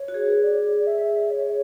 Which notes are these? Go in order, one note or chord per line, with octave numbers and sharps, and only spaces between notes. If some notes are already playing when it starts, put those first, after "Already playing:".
Already playing: C#5
F#4
G#4
B4
C#5
D5
E5
C#5